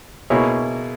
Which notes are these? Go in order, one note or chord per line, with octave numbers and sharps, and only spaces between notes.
B2 A#3 E4 G#4 C#5